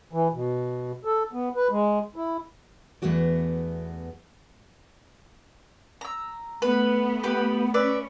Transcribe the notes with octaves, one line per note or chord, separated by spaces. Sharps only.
E3
B2
A4
B3
B4
G#3
E4
E2 E3 A3 B3 F#4 D5
A#5 E6
A3 B3 B4
G4 B4
C#4 B4 D5 E5